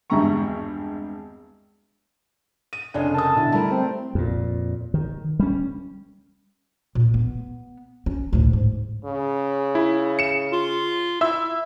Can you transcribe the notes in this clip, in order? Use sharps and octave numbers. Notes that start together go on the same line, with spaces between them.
G#1 E2 G2 E5 A#5 C#6
D#7
F1 C#3 D4 C#5 D#5
A#4 A5 D#6
B1 D3 E4
G3 A3 E4 A#4 A5
C4
F2 A#2
D#3
G3 C#4
A#2
B3
C#4
D2 A2
G#2
C#3
E4
C#7 E7
F4
E4 E5 E6